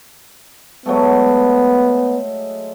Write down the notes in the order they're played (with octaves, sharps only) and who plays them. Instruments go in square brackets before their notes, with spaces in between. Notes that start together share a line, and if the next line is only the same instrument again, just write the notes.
[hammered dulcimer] F#3 G#3 A3 [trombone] B3